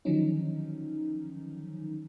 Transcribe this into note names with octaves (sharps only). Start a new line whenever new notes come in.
D3 D#3 F3 F#3 C#4 D#4